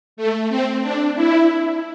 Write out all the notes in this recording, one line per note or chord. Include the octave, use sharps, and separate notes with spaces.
A3
C4
D4
E4